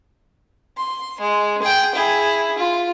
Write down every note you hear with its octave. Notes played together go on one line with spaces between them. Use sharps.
C6
G#3
G#4 G5
E4 G#4
F4